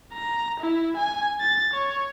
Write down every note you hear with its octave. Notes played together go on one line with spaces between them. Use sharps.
A#5
E4
G#5
A6
C#5